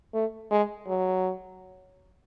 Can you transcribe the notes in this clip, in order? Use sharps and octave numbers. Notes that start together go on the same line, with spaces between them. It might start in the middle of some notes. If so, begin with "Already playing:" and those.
A3
G#3
F#3